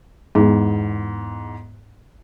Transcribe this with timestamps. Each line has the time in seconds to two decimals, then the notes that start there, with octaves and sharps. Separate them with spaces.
0.35 E2 G#2